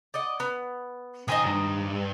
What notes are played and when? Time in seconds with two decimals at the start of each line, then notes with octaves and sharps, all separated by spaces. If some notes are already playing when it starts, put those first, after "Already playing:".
0.14 D5 D#5 F#5
0.40 B3
1.28 B1 D#3 C5 D#5 G#5
1.46 G2